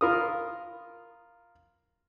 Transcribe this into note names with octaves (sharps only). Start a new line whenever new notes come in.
F4 A#4 B5 D#6